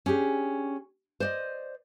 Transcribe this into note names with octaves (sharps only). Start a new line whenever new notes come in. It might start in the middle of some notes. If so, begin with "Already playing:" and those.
C#4 D4 G4 G#4
C5 D5 D#5